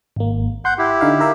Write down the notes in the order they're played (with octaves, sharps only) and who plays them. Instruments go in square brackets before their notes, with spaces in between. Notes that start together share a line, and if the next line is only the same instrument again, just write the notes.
[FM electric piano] G#1 A#3
[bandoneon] F#5 G6 [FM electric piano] C6
[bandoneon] E4 G4
[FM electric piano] D3 D#4 F5
A#4 E5 F5